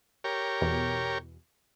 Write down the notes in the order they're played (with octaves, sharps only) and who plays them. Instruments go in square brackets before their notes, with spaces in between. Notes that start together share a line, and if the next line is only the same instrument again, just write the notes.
[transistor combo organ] G4 A#4 C#5
[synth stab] E2 B2